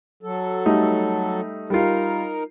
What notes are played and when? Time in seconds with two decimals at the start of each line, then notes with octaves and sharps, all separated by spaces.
0.23 F#3 A4
0.66 G3 A3 D#4
1.70 G3 D#4 F4 A#4